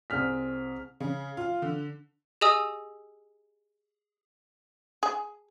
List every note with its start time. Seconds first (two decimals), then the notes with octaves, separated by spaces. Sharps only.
0.10 C2 C4 G#4 F6 B6
1.00 C#3
1.37 F4
1.62 D3
2.41 G4 G#4 D#5 G#5 D#6 E6
5.03 G#4